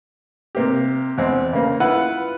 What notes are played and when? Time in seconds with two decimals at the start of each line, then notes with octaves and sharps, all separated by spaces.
0.55 C3 A#3 G4
1.18 E2 G#3 C4
1.53 C#3 A#3
1.80 E4 F4 B4 F#5